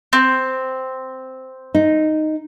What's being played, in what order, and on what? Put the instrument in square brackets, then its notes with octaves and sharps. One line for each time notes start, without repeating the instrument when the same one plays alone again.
[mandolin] C4
[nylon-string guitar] D#4